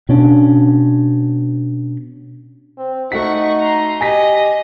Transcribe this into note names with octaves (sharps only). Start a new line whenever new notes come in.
B2 C#4 D4
C4
A3 D#4 F#4 F#5 C#6 B6
A#5 C6
G4 D#5 G#5 A#6 B6